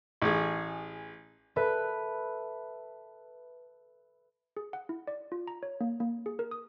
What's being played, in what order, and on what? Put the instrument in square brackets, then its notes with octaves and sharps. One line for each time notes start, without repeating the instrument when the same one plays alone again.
[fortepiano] A1 G#4
[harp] A4 B4 E5 B5 F#6
[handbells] G#4
F#5
E4
D5
F4
A#5
C#5
A#3
A#3
G#4
A#4
D#6